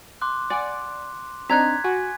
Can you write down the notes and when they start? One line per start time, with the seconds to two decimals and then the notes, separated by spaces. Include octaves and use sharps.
0.21 C6 D6 F#6
0.50 D5 F#5 G#5
1.50 C4 D4 D#4 A#5 F#6 G#6 B6
1.84 F#4 G#5